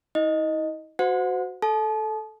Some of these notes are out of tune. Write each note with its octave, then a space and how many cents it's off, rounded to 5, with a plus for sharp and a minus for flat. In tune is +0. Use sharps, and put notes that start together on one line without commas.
E4 -45 D#5 +0
F#4 +0 C5 -30 F#5 -30
A4 -10 A5 -35